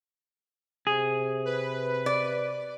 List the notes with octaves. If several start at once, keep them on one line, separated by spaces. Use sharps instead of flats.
C3 G#4
B4
D5